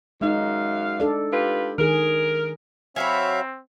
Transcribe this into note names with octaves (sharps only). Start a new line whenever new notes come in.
F#2 G#3 D#4 F5
D4 A4 D5
F4 G4 B4
D#3 G#4 A#4
F#3 C4 F#4 C#5 E5 F5 G#5 B5